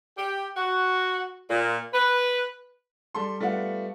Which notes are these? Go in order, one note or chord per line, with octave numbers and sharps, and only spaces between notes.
G4
F#4
A#2
B4
G3 A4 C6
G3 A3 B3 F4 F#5